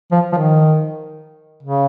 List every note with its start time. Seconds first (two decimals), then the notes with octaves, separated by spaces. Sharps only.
0.12 F3
0.32 F3
0.37 D#3
1.63 C#3